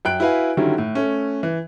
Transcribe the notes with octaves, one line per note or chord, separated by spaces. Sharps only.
F#2 G5 F#6 D7
E4 F#4 B4 F5 G#5
D3 D#3 F#3 G3 C#4 E4
A2
A3 C#4
E3